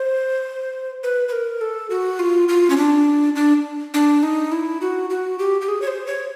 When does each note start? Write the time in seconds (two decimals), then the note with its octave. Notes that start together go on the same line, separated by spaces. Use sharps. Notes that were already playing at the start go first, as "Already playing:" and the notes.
Already playing: C5
1.03 B4
1.28 B4
1.32 A#4
1.61 A4
1.90 F#4
2.19 F4
2.49 F4
2.70 C#4
2.77 D4
3.35 D4
3.94 D4
4.23 D#4
4.52 E4
4.81 F#4
5.10 F#4
5.39 G4
5.61 G4
5.68 G#4
5.82 C#5
5.87 C5
6.07 C#5